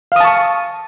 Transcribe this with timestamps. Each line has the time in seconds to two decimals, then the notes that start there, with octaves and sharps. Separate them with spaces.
0.12 F5
0.16 D#6
0.20 A5
0.25 C#6